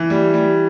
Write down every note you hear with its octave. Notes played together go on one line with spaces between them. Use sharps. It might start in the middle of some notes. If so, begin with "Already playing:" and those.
Already playing: E3
G3
G3